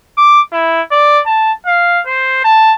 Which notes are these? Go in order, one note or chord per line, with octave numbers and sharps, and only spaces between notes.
D6
E4
D5
A5
F5
C5
A5